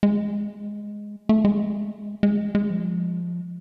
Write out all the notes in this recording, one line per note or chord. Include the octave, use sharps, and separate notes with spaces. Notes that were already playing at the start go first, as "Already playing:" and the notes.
G#3
A3
G#3
G#3
G#3
F3